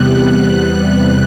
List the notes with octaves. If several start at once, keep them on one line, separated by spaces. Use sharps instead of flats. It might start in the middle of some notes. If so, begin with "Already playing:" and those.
Already playing: E2 C3 G3 B3 F#6
F#6